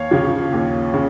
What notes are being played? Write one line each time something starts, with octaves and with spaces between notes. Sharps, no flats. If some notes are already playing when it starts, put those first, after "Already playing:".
Already playing: D#2 C#5 F5
C#3 F3
D#2
C#3